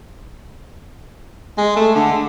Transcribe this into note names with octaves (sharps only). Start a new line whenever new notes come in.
G#3
A3
D3